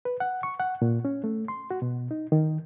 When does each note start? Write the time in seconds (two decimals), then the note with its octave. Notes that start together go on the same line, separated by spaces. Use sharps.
0.05 B4
0.20 F#5
0.43 C#6
0.60 F#5
0.82 A#2
1.05 C#4
1.24 A3
1.48 C6
1.71 F#4
1.82 B2
2.11 D#4
2.32 D#3